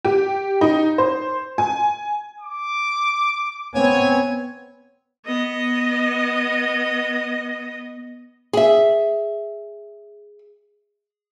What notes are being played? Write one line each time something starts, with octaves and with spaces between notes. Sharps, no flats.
G4
D#4
C5
G#5
D6
B3 C4 C#5 G#5
B3 D#5
G#4 E5